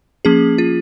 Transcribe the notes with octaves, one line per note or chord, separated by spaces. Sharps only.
F3 A#3 C#4 G#4
F4